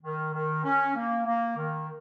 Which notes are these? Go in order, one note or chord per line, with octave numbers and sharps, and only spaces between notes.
D#3
D#3
C#4
A#3
A#3
D#3